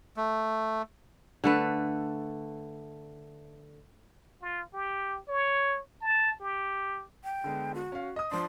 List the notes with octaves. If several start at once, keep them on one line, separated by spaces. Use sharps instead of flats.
A3
D3 A3 B4
F4
G4
C#5
A5
G4
G5
D3 G#3 B3
F#4
C#4 F5
D#5 D#6
F3 D4 C6